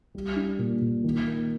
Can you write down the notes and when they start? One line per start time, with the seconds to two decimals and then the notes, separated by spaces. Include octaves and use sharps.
0.15 G3
0.36 D4
0.59 A#2
0.81 A#2
1.04 D#3
1.27 A#3